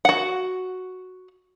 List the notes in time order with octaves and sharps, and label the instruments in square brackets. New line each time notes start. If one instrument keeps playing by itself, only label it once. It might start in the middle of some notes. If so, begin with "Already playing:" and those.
[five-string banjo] F#4 F#5